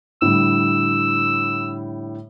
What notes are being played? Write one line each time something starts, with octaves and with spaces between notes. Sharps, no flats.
A2 D3 G3 E6